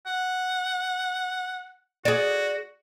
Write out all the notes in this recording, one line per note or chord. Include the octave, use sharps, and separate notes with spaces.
F#5
F#4 G#4 D5